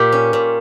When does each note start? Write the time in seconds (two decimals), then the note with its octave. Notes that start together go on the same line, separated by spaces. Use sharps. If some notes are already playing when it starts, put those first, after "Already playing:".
Already playing: A#2 G4
0.12 C#4
0.33 A#2